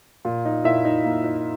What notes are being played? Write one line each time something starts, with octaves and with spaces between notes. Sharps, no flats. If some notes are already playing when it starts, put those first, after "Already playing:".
A#2
D#4
A#2 E4 E5
D#4
A#3
D#4